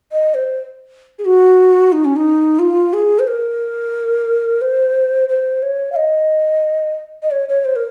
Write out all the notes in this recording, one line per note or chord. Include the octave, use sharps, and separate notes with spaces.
D#5
C5
G#4
F#4
D#4
C#4
D#4
F4
G#4
C5
A#4
C5
C5
C#5
F5
D#5
D#5
C#5
C#5
C5
A#4